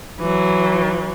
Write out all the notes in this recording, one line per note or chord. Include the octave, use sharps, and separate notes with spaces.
E3 F#3